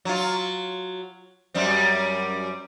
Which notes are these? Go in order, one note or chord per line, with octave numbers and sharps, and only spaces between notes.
F#3 F4
F#2 G3 C4